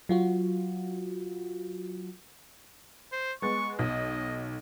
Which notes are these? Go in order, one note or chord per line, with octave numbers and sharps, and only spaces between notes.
F#3 F4 F#4
C5
G#3 B3 C#6 A6
B1 D#5